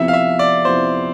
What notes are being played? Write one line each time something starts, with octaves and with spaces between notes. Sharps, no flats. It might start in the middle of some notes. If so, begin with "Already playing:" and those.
Already playing: F2 C3 F3 B3 E4 E5
F5
E5
D5
F2 C3 F3 B3 E4 C5